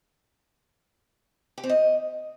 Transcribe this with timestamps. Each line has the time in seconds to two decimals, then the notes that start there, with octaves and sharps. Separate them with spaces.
1.58 G4
1.64 C4
1.69 D#5